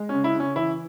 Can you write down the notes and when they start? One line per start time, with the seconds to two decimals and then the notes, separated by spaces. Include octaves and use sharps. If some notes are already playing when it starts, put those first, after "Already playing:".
Already playing: G#3
0.09 C#3 C#4
0.24 E4
0.35 C#3 C#4
0.56 E3 E4